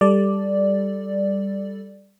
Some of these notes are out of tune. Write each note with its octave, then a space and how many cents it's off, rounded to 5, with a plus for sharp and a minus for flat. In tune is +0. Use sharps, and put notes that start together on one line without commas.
G3 +10 A4 +0 D5 +0